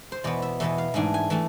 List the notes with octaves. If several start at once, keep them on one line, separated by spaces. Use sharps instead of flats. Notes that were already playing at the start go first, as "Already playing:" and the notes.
C5
E2 B2 B3 D5
E5
E2 B2 B3 E5
F5
G#2 E3 A3 D4 G#5
G#5
E3 A3 A5